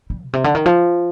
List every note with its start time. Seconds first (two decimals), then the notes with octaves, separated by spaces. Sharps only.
0.10 G3
0.23 B2
0.33 C3
0.44 D3
0.55 D#3
0.66 F3